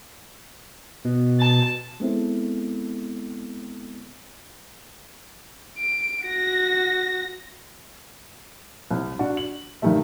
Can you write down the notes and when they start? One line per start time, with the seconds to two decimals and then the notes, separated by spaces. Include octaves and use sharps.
1.05 B2
1.40 A5
2.00 G#3 B3 C4 E4 A4
5.79 D7
6.25 F#4 A#6
8.91 C2
9.19 D4 F#4
9.37 F#7
9.82 G2 D#3 G3 A3 E5